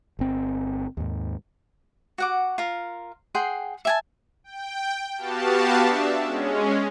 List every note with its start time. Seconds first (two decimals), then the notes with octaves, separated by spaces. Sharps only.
0.19 G1 C4
0.97 D#2 G#2
2.18 F#4 F#5 D6
2.58 F4 A#4
3.35 G#4 F#5 G5 C6
3.85 E5 G#5 A5
4.44 G5
5.17 B3 F#4 G4 F5 A5
5.79 D4 E5
6.24 G#3 C#4